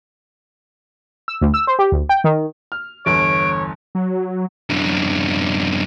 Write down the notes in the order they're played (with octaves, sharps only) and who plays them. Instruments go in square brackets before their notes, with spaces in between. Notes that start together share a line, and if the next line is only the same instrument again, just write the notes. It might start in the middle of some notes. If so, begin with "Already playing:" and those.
[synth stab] E6
D2
E6
C5
G4
D2
G5
D#3
[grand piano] F6
[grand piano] G1 E2 [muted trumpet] C#5 [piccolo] D7
[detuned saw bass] F#3
[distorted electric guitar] F#2 D3